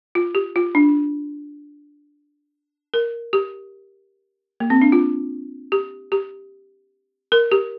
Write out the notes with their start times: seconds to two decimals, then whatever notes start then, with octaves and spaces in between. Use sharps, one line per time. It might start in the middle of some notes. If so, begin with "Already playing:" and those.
0.15 F4
0.35 G4
0.56 F4
0.75 D4
2.94 A#4
3.33 G4
4.60 A#3
4.70 C4
4.82 D4
4.92 F4
5.72 G4
6.12 G4
7.32 A#4
7.52 G4